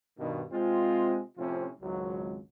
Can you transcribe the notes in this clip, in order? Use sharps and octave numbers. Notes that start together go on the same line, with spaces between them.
G2 B2 D#3
C3 G#3 C4 F4
A2 C3 F3 C4 C#4 F4
G#1 C#2 F#3